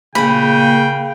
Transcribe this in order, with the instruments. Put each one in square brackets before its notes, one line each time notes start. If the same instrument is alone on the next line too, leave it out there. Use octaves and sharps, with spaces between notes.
[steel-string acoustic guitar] A#2 A#3 G#4 [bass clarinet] C#3 [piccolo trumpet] G5 [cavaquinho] B5